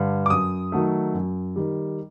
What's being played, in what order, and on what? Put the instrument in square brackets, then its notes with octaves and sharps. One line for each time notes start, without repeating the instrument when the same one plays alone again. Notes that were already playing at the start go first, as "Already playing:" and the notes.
Already playing: [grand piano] G2 D3
D6
F#2 D#6
D#3 F#3 A3
F#2
D#3 G3